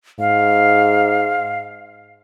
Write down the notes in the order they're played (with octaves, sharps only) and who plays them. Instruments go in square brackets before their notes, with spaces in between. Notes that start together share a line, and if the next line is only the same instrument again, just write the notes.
[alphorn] G#2 [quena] F5